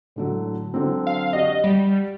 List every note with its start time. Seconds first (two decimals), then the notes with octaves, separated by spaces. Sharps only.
0.16 A2 D3 F#3
0.74 D3 F#3 C4
1.07 F5
1.33 F#4 G4 D5 D#5
1.64 G3